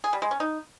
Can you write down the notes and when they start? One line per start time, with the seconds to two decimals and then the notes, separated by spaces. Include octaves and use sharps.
0.04 G#4
0.13 G3
0.22 G#3
0.31 C#4
0.40 D#4